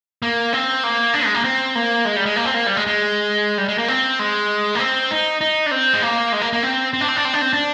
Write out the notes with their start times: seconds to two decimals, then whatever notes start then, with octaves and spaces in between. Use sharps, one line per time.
0.22 A#3
0.53 C4
0.84 A#3
1.14 D4
1.25 G#3
1.34 A#3
1.44 C4
1.75 A#3
2.05 G#3
2.16 G3
2.26 G#3
2.36 A#3
2.45 C4
2.54 A#3
2.67 G3
2.77 G#3
2.87 G#3
3.58 G3
3.68 G#3
3.78 A#3
3.88 C4
4.19 G#3
4.75 A#3
4.79 C4
5.11 D#4
5.41 D#4
5.66 D4
5.71 C4
5.93 G#3
6.02 A#3
6.32 G#3
6.42 A#3
6.53 A#3
6.63 C4
6.94 C4
7.01 D4
7.08 C4
7.16 D4
7.25 C4
7.34 D4
7.41 C4
7.53 D4